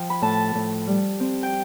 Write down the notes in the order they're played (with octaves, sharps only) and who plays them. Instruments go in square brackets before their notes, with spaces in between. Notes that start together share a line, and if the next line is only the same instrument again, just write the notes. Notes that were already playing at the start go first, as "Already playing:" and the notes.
Already playing: [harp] F3 G5
B5
A2 A5
A2
G3
C4
G5